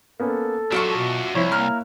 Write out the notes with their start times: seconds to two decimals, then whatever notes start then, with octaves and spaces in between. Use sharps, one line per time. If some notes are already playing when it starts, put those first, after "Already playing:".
0.20 A#3 B3 C#4 A4
0.72 F#3 D4 F4 F#4 E5 C#6
0.97 B2
1.35 C2 F3 E4 C#5
1.52 A#3 A#5 F6 F#6